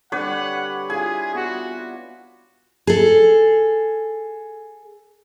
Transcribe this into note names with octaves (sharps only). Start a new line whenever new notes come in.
D3 G3 B4 C#5 D5 F#5
E4 F4 G#4 G#5
B3 F#4 C6
G#4 A4